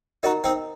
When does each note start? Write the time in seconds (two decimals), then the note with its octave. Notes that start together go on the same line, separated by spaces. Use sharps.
0.23 D#4 F#4 A#4 D#5 A#5
0.44 C4 D#4